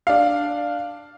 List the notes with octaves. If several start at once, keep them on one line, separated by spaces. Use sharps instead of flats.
D4 F5